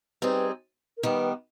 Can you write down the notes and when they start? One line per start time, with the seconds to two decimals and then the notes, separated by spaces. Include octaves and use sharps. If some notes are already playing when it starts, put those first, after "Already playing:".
0.22 G3 C4 D#4 G#4 B4
0.97 A#4
1.03 D#3 G3 B3 B4